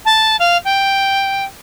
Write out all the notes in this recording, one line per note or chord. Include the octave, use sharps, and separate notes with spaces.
A5
F5
G5